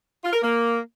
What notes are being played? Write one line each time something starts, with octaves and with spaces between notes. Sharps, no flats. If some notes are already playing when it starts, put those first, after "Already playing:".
F4
A#4
A#3